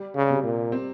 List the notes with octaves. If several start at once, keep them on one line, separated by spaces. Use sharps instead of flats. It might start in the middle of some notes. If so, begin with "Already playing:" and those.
Already playing: G3
C#3
C3
A#2
C4